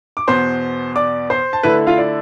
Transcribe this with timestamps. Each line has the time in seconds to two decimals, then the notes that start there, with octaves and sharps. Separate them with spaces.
0.17 D6
0.28 E2 B2 B3 C5 C6
0.96 D5 D6
1.30 C5 C6
1.53 A5
1.63 D3 A3 E4 B4 B5
1.87 F4 F5
1.98 D5